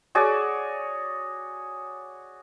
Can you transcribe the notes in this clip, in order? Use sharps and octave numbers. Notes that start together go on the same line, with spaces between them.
F#4 G#4 C#5 D5